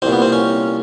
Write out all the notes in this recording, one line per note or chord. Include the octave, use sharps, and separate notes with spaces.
C2 A#2 C4
B3
C4
C#4